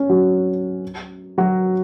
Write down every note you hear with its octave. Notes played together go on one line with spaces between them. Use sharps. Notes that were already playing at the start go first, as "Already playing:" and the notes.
Already playing: C#4
F#3 F#4
F#3 F#4